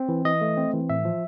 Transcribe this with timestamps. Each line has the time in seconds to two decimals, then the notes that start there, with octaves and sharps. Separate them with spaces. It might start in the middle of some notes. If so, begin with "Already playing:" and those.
Already playing: C4
0.09 E3
0.25 E3 D#5
0.41 A3
0.57 C4
0.73 E3
0.90 A2 E5
1.05 F3